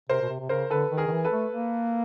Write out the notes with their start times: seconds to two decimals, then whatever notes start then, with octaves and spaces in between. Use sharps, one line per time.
0.09 C3 A#4 C5
0.21 B2
0.29 C3
0.40 C3
0.49 C#3 A#4 C5
0.70 D3 A4 B4
0.91 D#3
0.98 G#4 A#4
1.07 D#3
1.11 E3
1.25 A4 B4
1.32 A3
1.52 A#3